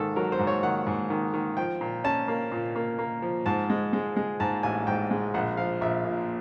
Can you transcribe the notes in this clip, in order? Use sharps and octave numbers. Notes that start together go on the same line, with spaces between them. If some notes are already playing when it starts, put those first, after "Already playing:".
Already playing: G#2 D#3 A4
F#3 A#4
C5
G#2
C#5
D#3 F#5
G#2
D#3
D#3
F3 G5
A#2
C#4 A5
A#3
A#2
A#3
A#3
F3
G#2 A5
G#3
G#3
G#3
G#2 A5
A1 G#5
G#2 G5
G#3
A#1 F#5
F3 F5
A#1 E5
A#2